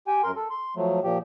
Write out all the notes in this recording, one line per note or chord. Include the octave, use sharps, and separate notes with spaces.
G4 G5 G#5
F#2 A#4 C6
A4
C6
F3 F#3 A3
A#2 F3 G4